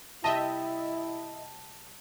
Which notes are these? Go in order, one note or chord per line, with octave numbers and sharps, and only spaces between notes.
C3 G3 E4 G4 D#5 E5 A5